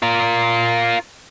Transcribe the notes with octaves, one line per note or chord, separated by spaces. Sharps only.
F4 A#4